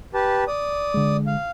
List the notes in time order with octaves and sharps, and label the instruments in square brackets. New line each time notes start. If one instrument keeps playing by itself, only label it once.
[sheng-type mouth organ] G4 B4 A5
D5 D#6
[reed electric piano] D3 G#3
[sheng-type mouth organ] F5